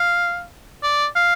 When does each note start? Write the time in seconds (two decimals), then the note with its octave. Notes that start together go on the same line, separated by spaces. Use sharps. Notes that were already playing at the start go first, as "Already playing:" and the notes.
Already playing: F5
0.83 D5
1.16 F5